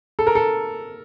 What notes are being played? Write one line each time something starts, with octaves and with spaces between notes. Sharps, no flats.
A4
A#4
A4